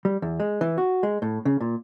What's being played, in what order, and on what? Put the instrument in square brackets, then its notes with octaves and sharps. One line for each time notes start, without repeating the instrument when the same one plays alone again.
[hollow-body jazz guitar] G3
E2
G#3
E3
F#4
G#3
A2
C#3
A#2